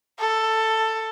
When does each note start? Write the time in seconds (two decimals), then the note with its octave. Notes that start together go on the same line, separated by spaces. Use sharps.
0.19 A4